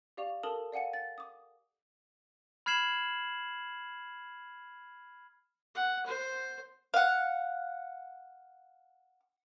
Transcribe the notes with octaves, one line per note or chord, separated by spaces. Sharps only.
G4 D5 F5 C#6 F7
A4 A#4 A5 D#6 F#7 G7
D5 F5 F#5 G#5 C#7
A6
D6 D#6
B5 F6 G#6 C7 E7 F#7
F#5
C5
F5 F#5